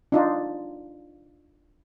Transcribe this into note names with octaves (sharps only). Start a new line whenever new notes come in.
D4 D#4 F4